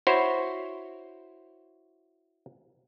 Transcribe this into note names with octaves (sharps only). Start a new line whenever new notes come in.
E4 F#4 C5 C#5